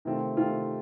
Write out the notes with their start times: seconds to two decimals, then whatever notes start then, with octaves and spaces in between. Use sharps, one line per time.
0.05 C3 D#3 A3 C4 F4
0.37 C3 D#3 A3 C4 F4